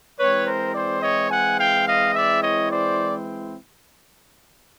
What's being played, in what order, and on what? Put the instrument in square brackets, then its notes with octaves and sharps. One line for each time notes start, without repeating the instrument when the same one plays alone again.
[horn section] E3 G#3 C4 E4 B4 C#5
A#4 C5
C5 D5
C#5 D#5
F#5 G#5
F5 G5
D#5 F5
D5 E5
C#5 D#5
C5 D5